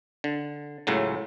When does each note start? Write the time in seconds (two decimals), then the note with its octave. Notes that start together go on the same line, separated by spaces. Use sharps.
0.24 D3
0.87 C#2 A2 C#3 F#3